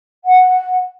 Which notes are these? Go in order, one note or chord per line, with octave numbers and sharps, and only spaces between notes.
F#5